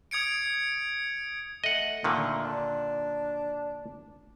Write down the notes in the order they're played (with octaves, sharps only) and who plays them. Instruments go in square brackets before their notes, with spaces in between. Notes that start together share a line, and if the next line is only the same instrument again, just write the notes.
[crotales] D#6 G#6 C#7 D7
[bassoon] A3 [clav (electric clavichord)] D#5 F#5
[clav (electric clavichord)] A#2 D3 D#3 [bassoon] A3
[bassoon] D4